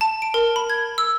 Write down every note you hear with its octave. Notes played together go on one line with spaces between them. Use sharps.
A5
D7
A#4
B5
G#6
E6